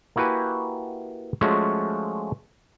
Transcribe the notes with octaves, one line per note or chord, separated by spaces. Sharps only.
A#3 E4 F#4 G4 B4 G#5
F3 G#3 A3 C#4 F4 F#4